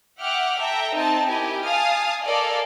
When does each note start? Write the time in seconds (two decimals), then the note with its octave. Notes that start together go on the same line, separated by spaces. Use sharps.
0.21 E5 F#5 G5 D6 F6
0.58 A4 E5 G5 A#5
0.96 C4 D#4 A5
1.28 E4 G4 A#4 D#5 G#5
1.62 F5 G#5 A5 D#6 F6
2.24 A4 A#4 D5 D#5 F5 G#5